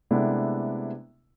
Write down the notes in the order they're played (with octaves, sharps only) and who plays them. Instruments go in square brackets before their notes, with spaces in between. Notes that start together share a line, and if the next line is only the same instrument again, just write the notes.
[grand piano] C3 G#3 A3 B3 D4 E4